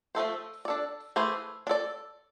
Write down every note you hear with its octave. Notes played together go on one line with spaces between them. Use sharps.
F3 A3 D4 A4 C5
D4 A4 D5
E3 A3 E4 G#4 C5
D4
A4 D5